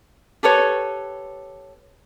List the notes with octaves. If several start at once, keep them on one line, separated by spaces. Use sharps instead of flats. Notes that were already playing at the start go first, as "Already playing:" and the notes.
G4 A4 B4 C#5